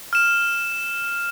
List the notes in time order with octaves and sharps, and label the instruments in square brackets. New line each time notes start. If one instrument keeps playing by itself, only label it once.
[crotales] F6 E7